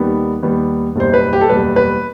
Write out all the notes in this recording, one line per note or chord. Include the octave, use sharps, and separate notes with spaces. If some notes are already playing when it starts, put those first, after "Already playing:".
Already playing: D#2 D#3 G3 B3
D#2 D#3 G3 B3
F#1 E2 B2 G3 C5
B4
G4
A4
F#1 E2 B2 G3 B4
B4